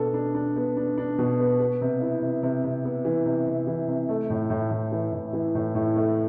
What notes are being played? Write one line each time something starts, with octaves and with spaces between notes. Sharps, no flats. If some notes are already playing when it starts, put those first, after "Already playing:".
Already playing: B2 B3 D4 A4
D4
D4
B3
D4
D4
B2
B3
B3
C3
E4
C3
C3
C3
B3
E3
C3
C3
E3
C3
A3
A2
A2
A2
E3
A2
E3
A2
A2
A3